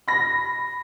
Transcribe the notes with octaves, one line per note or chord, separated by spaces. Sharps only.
B5 A#6